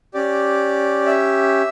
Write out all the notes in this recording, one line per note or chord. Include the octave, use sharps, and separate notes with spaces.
C#4 G4 D5
E5